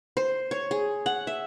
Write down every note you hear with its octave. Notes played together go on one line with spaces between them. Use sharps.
C5
C#5
G#4
F#5
E5